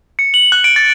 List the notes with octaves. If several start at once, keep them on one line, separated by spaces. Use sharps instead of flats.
C#7
F#7
F#6
D7
A6